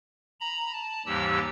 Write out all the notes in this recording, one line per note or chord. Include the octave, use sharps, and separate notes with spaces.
A#5 B5
A5
D#2 G#2 E3 G3 G4 E6